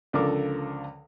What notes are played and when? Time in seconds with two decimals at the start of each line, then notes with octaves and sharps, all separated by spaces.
0.13 C#2 D3 F3 A4 A#4 D6